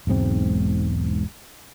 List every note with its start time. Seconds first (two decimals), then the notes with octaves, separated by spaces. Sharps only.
0.07 E1 B1 G#2 C4